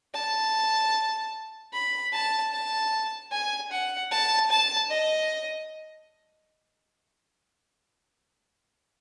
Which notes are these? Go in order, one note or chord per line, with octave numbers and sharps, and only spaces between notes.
A5
B5
A5
A5
G#5
F#5
A5
A5
D#5